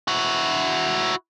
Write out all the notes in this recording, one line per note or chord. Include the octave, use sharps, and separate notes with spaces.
E4 F#4